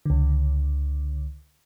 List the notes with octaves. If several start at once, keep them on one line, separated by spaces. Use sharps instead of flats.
C#2 D3